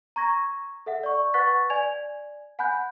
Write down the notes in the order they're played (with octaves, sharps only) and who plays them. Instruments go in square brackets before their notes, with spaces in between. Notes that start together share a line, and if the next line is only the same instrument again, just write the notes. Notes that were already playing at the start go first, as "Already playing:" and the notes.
[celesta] A#5 C#6 G#6 A#6
A4 E5 F#5
D5 C#6
B4 F#5 C#6 F#6 A6 B6
D5 G#5 G#6 F7
F#5 G#5 B5 F#6 G6